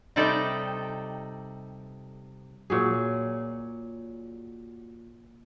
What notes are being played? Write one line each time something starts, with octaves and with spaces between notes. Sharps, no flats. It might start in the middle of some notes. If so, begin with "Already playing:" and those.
C3 G3 D#4 A4 D5 G5
A#2 F#3 G#4